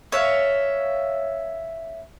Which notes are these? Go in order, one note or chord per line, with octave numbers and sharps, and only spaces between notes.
C#5 E5 F5